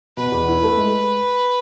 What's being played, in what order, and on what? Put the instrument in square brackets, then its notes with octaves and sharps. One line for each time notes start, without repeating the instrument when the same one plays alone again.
[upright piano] B2 [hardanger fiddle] B4
[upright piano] E2
E4
A3
G#3